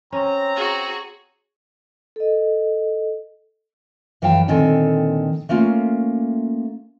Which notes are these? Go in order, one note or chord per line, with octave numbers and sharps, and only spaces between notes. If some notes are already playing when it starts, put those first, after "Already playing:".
C4 C#4 A#5
F#4 G#4
A4 D#5
F#2 E3 F#3 F5 G5 A5
A#2 D3 D#3 C4 A4 G#5
A3 A#3 C#4 F4